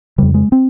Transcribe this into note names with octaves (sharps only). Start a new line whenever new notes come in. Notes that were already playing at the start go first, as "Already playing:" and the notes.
F2 C#3 G3
G#3
C4